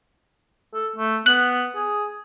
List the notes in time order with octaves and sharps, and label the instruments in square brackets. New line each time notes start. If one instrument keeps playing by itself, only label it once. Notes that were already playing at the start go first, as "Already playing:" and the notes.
[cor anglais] A4
A3
[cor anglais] B3 [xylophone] F#6 F#7
[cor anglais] G#4